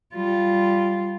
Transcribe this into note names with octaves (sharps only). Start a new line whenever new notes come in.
G3 F4